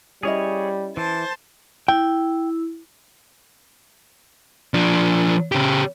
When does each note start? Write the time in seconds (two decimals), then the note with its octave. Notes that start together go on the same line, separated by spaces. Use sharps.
0.23 G3 C#4 E4 G#4 C#5 D#5
0.97 E3 C5 A5
1.88 E4 G5
4.74 F3 D4
5.52 C#3 G4